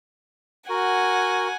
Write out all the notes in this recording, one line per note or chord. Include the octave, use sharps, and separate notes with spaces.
F#4 A#4 F#5 G#5